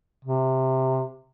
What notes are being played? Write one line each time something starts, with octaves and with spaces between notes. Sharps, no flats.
C3